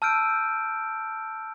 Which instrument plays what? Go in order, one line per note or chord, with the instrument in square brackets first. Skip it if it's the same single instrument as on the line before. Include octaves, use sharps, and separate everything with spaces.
[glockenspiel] A5 E6 F6 G6 D7